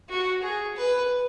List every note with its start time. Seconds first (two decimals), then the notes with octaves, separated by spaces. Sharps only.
0.09 F#4
0.42 G#4
0.76 B4